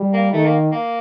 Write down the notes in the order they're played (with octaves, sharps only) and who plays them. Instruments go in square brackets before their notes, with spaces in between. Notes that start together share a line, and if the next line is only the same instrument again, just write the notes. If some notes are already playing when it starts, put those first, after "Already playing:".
Already playing: [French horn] G3
[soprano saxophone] A#3
[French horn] D#3 [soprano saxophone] A3
[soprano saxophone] A#3
A#3